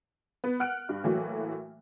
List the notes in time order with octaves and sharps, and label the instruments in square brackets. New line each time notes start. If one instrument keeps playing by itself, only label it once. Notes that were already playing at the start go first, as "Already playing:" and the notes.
[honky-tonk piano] B3
F#5 F6 F#6 D7
G2
A2 E3 F#3 A3 A#3 F#4